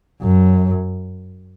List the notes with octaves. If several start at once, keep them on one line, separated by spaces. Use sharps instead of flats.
F#2